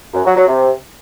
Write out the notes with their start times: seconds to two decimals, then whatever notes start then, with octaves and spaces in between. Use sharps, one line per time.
0.14 F#2
0.25 F#3
0.36 F#3
0.47 C3